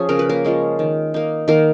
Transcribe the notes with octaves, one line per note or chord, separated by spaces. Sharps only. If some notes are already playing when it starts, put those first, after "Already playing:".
Already playing: F3 C#4 G#4
C#3 A#4
B4
A#3 A#4
F3 G#3 C#4
D#3
A#3 D#4
D#3 A#3 A#4